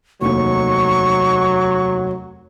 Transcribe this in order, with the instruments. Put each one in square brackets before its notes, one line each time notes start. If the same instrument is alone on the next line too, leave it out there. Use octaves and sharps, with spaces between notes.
[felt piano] F1 D#2 [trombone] F#3 [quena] C#6